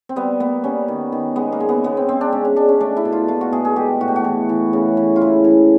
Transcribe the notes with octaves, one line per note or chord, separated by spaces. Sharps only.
C4
G3 B3
A#3 B3
G3 C#4
D#3
D#3
G#3 B3
A#3
G#3
B3
C#3 B3
C4
C#3 C4
D4
G#3 C#4
C#4
G#3 D4
C#4
A3 D4
E4
B2
F4
A3 F4
F#4
B2 G#4
G#4
G#3 G4
A2 F#4
G4
F#4
E3
E3
C#3
E3
F4
C#3 E4
E3